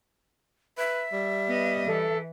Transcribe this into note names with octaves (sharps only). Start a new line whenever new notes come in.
B4 E5
G3
B3 D#5
E3 A4